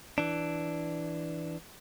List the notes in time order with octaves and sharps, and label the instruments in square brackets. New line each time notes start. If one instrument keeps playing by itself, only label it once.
[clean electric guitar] E3 D4